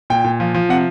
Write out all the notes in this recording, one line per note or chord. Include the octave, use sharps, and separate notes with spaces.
A#2 G5
A#2
F3
F3
C3 F#5